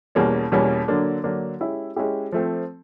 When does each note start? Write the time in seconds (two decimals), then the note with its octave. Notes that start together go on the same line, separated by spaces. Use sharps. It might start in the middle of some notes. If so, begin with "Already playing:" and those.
0.15 E2 B2 G3 A#3 C#4
0.52 E2 B2 G3 A#3 C#4
0.88 D3 F#3 A#3 D4
1.24 D3 F#3 A#3 D4
1.60 G#3 C#4 E4 G4
1.96 G#3 C#4 E4 G4
2.32 F3 A3 C4